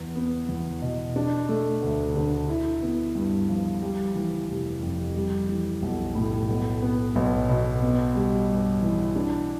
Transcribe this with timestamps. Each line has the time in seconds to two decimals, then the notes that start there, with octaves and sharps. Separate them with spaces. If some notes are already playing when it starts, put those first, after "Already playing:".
Already playing: E2
0.16 B3
0.49 E2
0.82 B2
1.16 D4
1.49 A3
1.82 D2
2.15 D3
2.48 E4
2.82 B3
3.15 G2
3.49 F3
3.82 G3
4.15 E3
4.49 F1
4.83 F2
5.16 G3
5.49 E3
5.82 B1
6.15 A2
6.49 B1
6.82 B3
7.15 B1
7.49 B2
7.82 B3
8.15 G3
8.49 G2
8.82 E3
9.16 D4